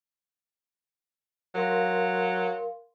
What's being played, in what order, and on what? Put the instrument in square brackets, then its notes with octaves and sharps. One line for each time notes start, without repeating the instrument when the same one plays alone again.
[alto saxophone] F#3 [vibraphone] A#4 F5 C6